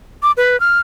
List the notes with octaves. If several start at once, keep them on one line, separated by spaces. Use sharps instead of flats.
D6
B4
F6